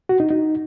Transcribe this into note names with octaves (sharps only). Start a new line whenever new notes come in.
F#4
D#4
D#4